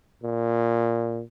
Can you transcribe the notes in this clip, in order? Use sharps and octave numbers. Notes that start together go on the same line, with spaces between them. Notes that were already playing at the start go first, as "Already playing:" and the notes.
A#2